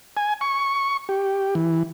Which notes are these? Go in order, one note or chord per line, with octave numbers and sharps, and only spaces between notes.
G#5
C#6
G4
E3